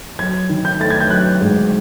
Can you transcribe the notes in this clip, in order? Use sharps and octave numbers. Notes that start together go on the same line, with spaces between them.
F#3 G#6
D#3
G6
A3 A6
G#6
G6
F#3 F#6
G#2